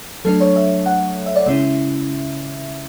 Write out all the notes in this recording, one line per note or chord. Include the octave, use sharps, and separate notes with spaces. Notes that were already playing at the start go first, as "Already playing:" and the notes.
F#3 A3 D4 A4
C#5
E5
F#5
E5
D5
C#3 G#3 C#4 E4 E5